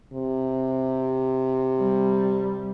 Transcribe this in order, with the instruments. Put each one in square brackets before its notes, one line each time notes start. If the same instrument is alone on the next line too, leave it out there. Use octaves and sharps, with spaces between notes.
[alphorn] C3
[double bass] G3